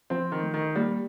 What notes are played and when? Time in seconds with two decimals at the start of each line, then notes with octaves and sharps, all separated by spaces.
0.10 F3 C4
0.32 D#3
0.43 A3
0.54 D#3
0.75 G3 A#3